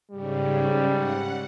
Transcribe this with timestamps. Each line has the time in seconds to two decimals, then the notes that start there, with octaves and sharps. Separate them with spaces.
0.11 G#2 C#3 G3
0.92 F#5